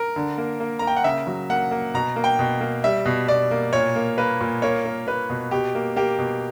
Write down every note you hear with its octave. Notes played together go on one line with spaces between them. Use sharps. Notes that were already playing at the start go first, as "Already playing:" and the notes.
Already playing: A#4
D3
A#3
A#3
A#3 A#5
G5
F#5
C#3 E5
F#3
A#3 F#5
A#3
B2 A#5
A#3
G5
B2
A#3
G3 E5
B2
B2 D5
A#3
A#2 C#5
A#3
A#3 B4
A#2
A#3 C#5
A#3
A#3 B4
B2
B2 G4
A#3
A#3 G4
B2